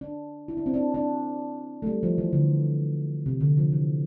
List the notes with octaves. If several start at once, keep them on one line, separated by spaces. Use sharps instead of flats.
D4
E4
D4
C4
D4
D4
A3
G3
F3
E3
D3
C3
D3
F3
E3